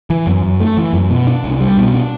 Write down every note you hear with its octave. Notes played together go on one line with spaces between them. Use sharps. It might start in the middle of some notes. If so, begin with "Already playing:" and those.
E3
F#2
F#2
A3
E3
F#2
B2
D4
C2
G3
B2
D4